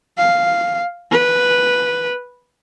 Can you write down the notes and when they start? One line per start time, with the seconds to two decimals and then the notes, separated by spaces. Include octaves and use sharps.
0.18 F5
1.12 B4